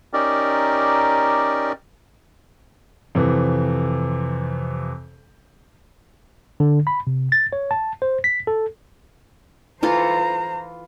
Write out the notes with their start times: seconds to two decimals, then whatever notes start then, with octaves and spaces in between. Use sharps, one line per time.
0.13 C#4 D#4 G4 A#4 D5
3.15 F2 C3 E3
6.60 D3
6.87 B5
7.07 C3
7.32 A6
7.53 C#5
7.71 A5
8.02 C5
8.24 B6
8.47 A4
9.83 E3 F4 A4 C5 A#5